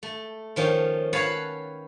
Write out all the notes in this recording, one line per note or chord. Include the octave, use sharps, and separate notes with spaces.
A3
D#3 F3 C#4
B4 C#5 F5 F#5 G#5 A5